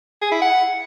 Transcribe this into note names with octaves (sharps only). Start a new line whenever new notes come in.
G#4
E4
F#5